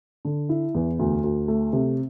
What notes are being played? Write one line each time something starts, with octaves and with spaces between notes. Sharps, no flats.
D3
E4
E2
D2
D2
A3
C3